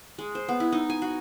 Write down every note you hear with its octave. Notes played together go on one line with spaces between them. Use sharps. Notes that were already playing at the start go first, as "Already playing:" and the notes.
G#3
C5
B3
E4
D#4
G#5
F#4